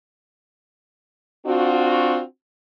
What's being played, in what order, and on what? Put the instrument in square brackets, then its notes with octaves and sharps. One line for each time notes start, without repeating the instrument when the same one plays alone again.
[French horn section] C4 D4 F4 F#4